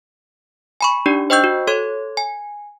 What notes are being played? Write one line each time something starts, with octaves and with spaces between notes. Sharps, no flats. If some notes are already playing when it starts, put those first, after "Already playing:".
G#5 B5 C#6
D4 D#4 G4 D5
C5 D#5 G5 C#6 E6 G6
F#4
A4 C#5 C6 G#6
G#5